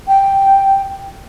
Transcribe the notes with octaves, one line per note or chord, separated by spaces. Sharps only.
G5